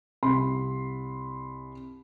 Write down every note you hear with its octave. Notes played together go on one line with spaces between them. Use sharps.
C2 B5 C6